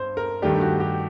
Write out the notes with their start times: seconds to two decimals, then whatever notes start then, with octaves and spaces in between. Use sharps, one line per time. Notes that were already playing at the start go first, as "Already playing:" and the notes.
Already playing: G2 C5
0.17 A#4
0.42 G2 D#3 A3 D4 G4
0.61 F#4
0.80 G4